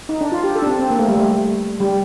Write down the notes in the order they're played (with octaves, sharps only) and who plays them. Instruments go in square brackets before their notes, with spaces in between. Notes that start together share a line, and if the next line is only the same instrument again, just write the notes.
[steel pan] D#4
D4
F4
G4
A4
D4
C4
C4
A#3
A3
G3
A3
G3